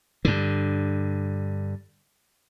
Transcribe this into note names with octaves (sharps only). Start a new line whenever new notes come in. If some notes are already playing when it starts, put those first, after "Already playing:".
G2 D3